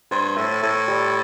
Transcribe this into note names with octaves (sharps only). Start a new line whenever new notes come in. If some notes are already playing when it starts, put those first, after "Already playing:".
G2 C5
A2 E5
A2 E5
G3